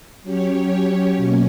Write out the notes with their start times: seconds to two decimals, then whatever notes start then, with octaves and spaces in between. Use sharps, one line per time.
0.23 F#3 C#4 G4 C#5
1.16 B2 F#3 A#3 C#4